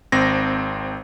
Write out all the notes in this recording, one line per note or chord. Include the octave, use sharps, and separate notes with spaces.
G#1 C4 A#6